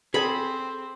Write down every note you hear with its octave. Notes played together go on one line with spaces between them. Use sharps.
C4 G#4 A4 G#5 B5